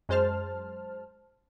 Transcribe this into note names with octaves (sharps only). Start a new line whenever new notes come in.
F#2 G#3 C5 A5 F6